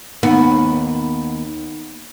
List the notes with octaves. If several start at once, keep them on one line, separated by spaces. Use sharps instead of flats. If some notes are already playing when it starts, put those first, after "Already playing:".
D#2 B3